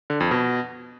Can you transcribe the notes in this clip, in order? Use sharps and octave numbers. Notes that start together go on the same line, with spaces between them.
D3
F2
B2